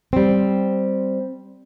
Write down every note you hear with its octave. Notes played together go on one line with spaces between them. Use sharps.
G3 C4